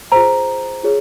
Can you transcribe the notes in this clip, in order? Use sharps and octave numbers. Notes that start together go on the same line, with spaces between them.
F4 G#4 C5 A#5
F4 G#4 C#5